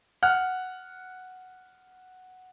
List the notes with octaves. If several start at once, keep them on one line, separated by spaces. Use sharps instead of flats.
F#5 F6 F#6